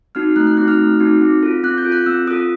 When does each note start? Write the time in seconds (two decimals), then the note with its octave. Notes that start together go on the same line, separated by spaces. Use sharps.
0.15 C4 D#4 F#4 F6
0.36 A3 F#6
0.47 F#6
0.57 C4 D#4 F#4 F#6
0.68 F6
0.79 A3
1.00 C4 D#4 F#4
1.21 C4
1.43 F4 A4
1.64 C4 F#6
1.78 G6
1.85 F4 A4
1.92 F#6
2.06 C4 E6
2.27 F4 A4 D#6